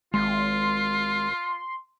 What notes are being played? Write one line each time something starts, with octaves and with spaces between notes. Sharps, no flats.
G#1 G#3 F4 C6